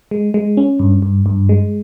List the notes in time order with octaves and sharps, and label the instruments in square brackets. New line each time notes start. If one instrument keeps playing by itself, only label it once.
[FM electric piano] G#3
G#3
C#4
G2
G2
G2
G#3